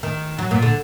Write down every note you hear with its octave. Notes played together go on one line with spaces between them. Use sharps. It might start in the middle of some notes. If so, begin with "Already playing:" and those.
D#3
F#3
A#2
D3